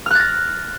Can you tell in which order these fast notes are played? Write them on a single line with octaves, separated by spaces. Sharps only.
F6 F#6 A6 A#6